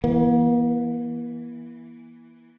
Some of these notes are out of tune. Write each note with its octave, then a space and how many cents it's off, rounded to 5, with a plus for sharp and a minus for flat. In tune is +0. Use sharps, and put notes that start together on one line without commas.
E3 +0 A#3 +45